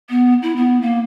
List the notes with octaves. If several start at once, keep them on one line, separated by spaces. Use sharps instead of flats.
B3
E4
B3
A#3